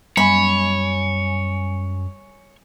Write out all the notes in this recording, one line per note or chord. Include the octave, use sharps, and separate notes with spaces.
F#2 G3 C#5 G#5 B5